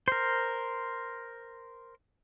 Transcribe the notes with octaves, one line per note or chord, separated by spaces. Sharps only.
A#4 C5